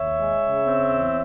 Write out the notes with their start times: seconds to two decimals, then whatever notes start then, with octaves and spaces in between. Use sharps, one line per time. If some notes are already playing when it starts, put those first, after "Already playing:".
Already playing: D#2 C#5 E5
0.17 G#3
0.42 C#3
0.67 C4
0.92 E2